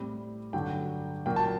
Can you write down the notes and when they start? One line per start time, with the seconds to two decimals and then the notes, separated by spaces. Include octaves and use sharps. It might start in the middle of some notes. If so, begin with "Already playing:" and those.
Already playing: A2 G3 C4
0.53 G2 D3 F#3 G5
1.26 A#2 F#3 A#3 G5
1.36 A5